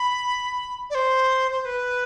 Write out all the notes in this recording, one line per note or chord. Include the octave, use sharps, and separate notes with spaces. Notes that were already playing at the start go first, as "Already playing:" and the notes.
Already playing: B5
D5
C5
C5
C5
B4